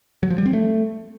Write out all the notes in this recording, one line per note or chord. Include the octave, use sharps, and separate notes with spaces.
F#3
F3
G3
C4
A3